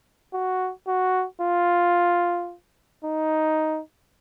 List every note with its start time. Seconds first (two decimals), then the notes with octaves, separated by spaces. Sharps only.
0.33 F#4
0.88 F#4
1.41 F4
3.04 D#4